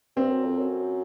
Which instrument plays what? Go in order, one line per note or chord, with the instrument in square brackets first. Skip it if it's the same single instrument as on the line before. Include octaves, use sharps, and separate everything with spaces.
[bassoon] G2 [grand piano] C4
[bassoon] F#2
F2
F#2